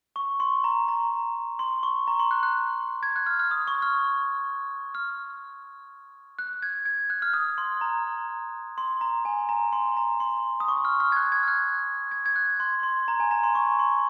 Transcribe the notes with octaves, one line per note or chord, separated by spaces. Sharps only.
C#6
C6
A#5
A#5
C6
C#6
A#5
C6
F#6
F#6
G#6
F#6
F6
F6
D#6
C#6
F6
F6
F#6
G#6
G#6
F#6
F6
D#6
C6
A#5
C6
A#5
G#5
A#5
C6
A#5
C6
D#6
C#6
F6
F6
G#6
F#6
G#6
F6
F#6
G#6
G#6
F#6
C6
C6
A#5
G#5
A#5
C6
C#6
C6